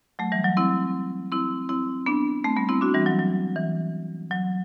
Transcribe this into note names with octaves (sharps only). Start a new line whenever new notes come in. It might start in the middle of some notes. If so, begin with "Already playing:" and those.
F#3 A3
E3 G3
F#3
C4 E4
C4 E4
C4 E4
B3 D4
A3 C4
G3 B3
C4 E4
D4 F#4
E3 G3
F#3
F#3
E3
F#3